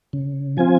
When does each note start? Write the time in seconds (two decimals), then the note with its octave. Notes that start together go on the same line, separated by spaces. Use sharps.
0.13 C#3
0.57 F3 C4 F4 G#5